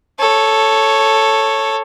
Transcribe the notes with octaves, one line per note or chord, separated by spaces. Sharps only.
A4 C#5